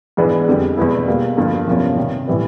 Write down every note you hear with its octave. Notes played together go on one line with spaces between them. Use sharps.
G#2 E3 G#3 B3 D4
F2 D3 G3
E2 B2 G#3 B3 E4
B2 G3 A#3
G2 D3 F3 A#3
E2 C3 F3 A#3 C#4
C3 D#3 G3
A2 E3 G3 B3